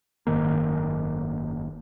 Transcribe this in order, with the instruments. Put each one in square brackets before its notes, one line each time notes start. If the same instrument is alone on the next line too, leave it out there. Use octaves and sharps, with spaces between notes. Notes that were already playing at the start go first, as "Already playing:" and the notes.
[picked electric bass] F#1 G#2 D#3 A#3